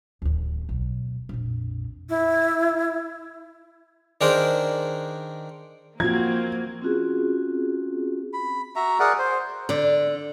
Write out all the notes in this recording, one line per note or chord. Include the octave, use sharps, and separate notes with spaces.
D1 D#2
B1
A#1 F2
E4
D#3 D4 G#4 A#4 C5
F3 A#3 C4 F#4 G#6
C4 C#4 F4 F#4 G#4
B5
F#4 E5 A#5
G#4 A#4 D5 F#5
C5
D3 D5